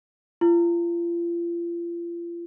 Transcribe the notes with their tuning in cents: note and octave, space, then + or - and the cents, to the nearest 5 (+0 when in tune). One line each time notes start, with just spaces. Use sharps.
F4 -35